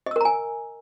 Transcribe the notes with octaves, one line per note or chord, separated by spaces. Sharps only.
A#4 D#5 G#5 A#5 E6